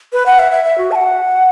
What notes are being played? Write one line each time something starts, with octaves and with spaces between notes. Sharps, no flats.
B4
F#5
E5
E5
E5
F#4
A5
F#5